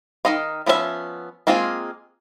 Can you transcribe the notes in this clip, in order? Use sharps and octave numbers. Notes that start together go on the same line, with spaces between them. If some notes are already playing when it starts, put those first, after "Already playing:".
D#3 F#3 D#4 D#5 F5
F3 B3 C#4 F4 E5
G#3 A#3 C4 F4 G#4